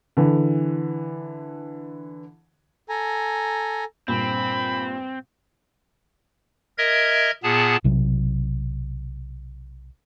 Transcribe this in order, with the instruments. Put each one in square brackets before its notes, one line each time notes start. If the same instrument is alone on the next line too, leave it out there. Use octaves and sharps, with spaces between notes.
[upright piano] D3 E3
[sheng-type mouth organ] A4 G#5 A#5
[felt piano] G2 A#2 [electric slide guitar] C4 [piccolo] B5
[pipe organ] A#4 D#5 E5 G#6
A#2 B3 G#4 A5
[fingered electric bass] B1 C3 F#3